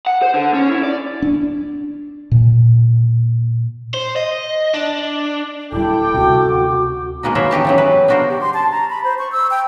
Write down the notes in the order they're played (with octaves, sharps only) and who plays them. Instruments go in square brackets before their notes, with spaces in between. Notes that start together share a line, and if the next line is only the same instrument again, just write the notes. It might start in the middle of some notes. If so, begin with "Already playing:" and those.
[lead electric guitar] F#5
C5
D3
C#4
E4
D5
[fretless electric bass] D4
A#2
[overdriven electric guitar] C5
D#5
D4
[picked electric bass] D1 G3 [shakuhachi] E4 [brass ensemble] A4 G5 [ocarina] D6
[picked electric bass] D2 C3 [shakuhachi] F#4
[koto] B2 G#3 A#3 B3 D#4
F#3 B3 A#4 C5 C#5 E5
E3 D#4 G4 A5
C#3 E3 F#3
B4
B3 D4 F#4 A#4 C5
[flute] G4
C6
A5
A#5
B5
C5
C#6
E6
G5